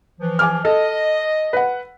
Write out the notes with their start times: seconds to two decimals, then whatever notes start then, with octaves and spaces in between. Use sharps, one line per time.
0.20 E3 F3
0.39 G#5 D6 F6
0.65 A4 D#5
1.53 B4 F#5